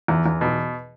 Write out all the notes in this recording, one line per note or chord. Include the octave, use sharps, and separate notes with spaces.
E2
E2
B2